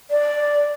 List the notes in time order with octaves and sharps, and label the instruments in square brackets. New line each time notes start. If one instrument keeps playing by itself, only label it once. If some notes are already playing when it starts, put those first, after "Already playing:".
[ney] D5